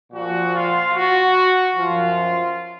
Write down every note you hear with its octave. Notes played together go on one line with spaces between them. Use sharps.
A#2 F3 F#4
F4
F#4
F#2 F3 F4